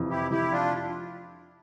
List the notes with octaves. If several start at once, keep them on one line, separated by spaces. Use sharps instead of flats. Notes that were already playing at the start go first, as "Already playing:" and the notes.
Already playing: F2 C3 E3
E4 G4
F1 E4 G4
D4 F4